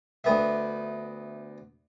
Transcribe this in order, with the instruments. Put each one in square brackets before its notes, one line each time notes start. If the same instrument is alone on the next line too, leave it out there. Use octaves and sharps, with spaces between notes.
[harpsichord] D2 B3 E5